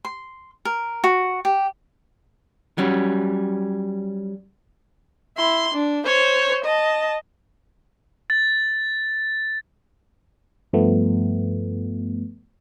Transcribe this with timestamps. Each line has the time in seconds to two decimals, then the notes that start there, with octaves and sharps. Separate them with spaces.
0.05 C6
0.65 A#4
1.04 F#4
1.45 G4
2.78 F#3 G3 C#4
5.38 E4 C6
5.74 D4
6.06 C5 C#5
6.65 D#5 A5
8.30 A6
10.73 G2 F3 A3 B3